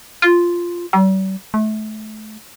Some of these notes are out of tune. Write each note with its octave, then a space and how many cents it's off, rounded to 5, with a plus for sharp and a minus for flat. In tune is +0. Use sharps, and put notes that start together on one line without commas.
F4 -5
G3 -45
A3 -30